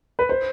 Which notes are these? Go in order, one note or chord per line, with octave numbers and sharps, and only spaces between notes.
B4
C5